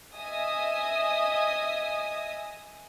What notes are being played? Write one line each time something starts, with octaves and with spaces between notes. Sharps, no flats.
D#5 E5 G#5 D#6